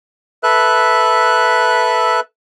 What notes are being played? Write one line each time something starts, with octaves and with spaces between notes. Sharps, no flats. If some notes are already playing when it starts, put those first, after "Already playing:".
A4 B4 E5 F#6